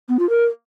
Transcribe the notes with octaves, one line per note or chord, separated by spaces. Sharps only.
B3
F4
A#4